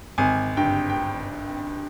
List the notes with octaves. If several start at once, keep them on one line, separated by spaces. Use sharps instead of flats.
G#1 G#5
G2 G5
G5